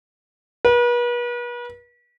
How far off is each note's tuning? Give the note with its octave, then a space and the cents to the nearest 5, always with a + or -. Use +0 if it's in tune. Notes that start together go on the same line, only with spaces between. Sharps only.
B4 -40